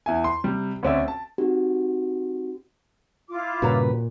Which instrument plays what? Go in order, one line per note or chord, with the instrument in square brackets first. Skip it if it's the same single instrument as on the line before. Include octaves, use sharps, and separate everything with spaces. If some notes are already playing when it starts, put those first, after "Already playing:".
[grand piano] E2 E5 G#5
C6
C3 G3
D2 C4 C#4 D5 E5 E6
A5
[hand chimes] C4 D#4 F#4 G4
[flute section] E4 F4 D6
[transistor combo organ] G2 C#3 B4 [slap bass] A#2 [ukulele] F#4 C#5 A#5